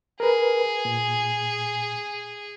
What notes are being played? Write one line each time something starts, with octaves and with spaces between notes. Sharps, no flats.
G#4 A#4 B4
A#2